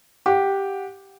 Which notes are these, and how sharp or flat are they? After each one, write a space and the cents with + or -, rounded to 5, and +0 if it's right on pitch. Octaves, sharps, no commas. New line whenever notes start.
G4 +0 F#5 -15